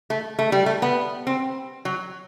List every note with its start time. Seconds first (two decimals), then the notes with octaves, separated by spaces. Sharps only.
0.10 A3
0.39 A3
0.52 G3
0.66 A3
0.82 B3
1.27 C4
1.85 F#3